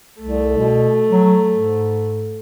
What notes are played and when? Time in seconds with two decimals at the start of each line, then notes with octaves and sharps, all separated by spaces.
0.21 C2 A3
0.58 B2
1.10 F#3
1.52 G#2